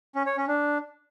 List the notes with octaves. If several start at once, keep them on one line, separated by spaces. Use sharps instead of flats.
C#4
C#5
C#4
D4